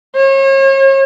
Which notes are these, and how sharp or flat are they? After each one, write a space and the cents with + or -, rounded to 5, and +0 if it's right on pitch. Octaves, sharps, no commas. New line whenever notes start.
C#5 -40